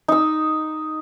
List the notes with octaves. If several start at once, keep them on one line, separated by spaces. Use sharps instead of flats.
D#4 E6